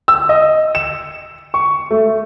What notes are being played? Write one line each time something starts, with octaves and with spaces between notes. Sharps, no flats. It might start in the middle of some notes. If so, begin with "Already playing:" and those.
E6
D#5
E7
C#6
A3